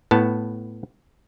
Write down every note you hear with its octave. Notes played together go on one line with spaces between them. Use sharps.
A2 B3 A5